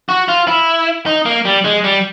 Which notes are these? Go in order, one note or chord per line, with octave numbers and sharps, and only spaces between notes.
F#4
F4
E4
D#4
A#3
G3
G#3
G3